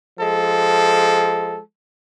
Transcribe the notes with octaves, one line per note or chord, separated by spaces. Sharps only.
F3 G#3 A4